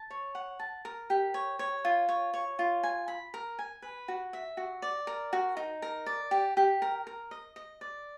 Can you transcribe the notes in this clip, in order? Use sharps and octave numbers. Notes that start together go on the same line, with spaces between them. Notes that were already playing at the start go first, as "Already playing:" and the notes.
Already playing: A5
C#5
F#5
A5
A#4
G4
C#5
C#5
F4
C#5
C#5
F4
G#5
B5
A#4
G#5
B4
F#4
E5
F#4
D5
A#4
F#4
D#4
A#4
D5
G4
G4
A#4
A#4
D#5
D#5
D5